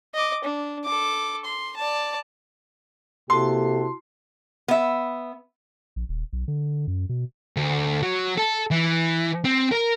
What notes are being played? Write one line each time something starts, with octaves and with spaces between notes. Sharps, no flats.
D#5 D6
D4
A4 D6
C6
D5 A5
C3 A#3 E4 F#4 G4 A4 A5 C6
B3 E5
A#1
D#1
B1
D3
F#2
B2
D2
F#3
A4
E3
C4
A#4